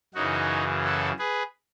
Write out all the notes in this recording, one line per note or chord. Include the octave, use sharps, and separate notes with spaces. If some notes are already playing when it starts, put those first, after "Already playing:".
F#2 C#3 E3 D#4 F#4
F#4 A4
G#4 B4